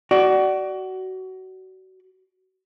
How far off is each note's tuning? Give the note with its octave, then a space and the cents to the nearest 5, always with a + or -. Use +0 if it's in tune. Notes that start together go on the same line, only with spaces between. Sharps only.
F#4 +25 D5 +5